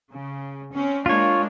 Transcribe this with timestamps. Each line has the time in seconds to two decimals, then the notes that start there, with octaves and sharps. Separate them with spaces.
0.11 C#3
0.72 C4 C#4
1.06 G#3 A#3 D4 F4 C#5